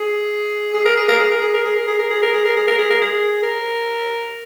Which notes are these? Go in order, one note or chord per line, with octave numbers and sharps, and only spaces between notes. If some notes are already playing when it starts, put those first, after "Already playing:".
Already playing: G#4
G#4
A#4
G#4
A#4
G#4
A#4
G#4
A#4
G#4
A#4
G#4
A#4
G#4
A#4
G#4
A#4
G#4
A#4
G#4
A#4
G#4
A#4